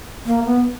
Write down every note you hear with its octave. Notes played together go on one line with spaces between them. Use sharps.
A#3
B3